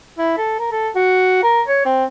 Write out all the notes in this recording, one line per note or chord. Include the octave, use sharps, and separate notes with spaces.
E4
A4
A#4
A4
F#4
A#4
C#5
C4